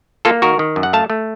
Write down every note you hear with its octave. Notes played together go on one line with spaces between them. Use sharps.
A#3 F4 A4
D#3 F#4 A#4
D#3
F#2
F#5
A3 F5 A5
A3